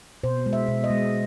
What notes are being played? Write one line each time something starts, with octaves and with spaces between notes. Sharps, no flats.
B2 C5
G#3
E5
B2
D#5
G#3